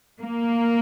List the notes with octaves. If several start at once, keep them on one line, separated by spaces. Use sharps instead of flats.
A#3